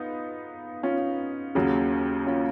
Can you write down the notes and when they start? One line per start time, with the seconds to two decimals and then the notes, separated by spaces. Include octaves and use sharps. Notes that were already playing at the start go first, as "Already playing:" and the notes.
Already playing: B3 D#4 F4
0.83 C#4 F4
1.55 D#2 C#3 F#3
2.27 C#4 F4